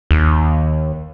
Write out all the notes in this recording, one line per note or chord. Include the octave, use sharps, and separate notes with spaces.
D#2